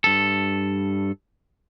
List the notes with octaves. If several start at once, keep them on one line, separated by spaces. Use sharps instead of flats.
G2 A4